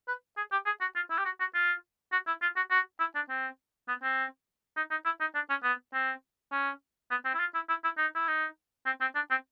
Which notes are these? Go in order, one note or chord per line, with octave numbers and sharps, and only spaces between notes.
B4
G#4
G4
G#4
F#4
F4
E4
G4
F#4
F#4
F4
F#4
E4
F4
F#4
F#4
E4
D4
C4
B3
C4
D#4
D#4
E4
D#4
D4
C#4
B3
C4
C#4
B3
C4
E4
F4
E4
E4
E4
D#4
E4
D#4
C4
C4
D4
C4